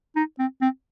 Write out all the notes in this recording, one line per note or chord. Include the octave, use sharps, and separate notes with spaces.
D#4
C4
C4